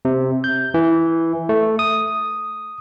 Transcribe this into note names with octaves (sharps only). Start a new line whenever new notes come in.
C3
G6
E3
A3
D#6